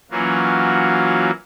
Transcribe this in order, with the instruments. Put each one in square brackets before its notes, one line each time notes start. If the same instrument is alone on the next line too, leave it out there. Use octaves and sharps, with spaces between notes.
[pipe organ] E3 F#3 A#3 C#4 F4 F#4